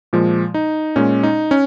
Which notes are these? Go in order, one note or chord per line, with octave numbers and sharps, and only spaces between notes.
A#2 F3 G#3
D#4
A#2 G#3 C#4
D#4
C#4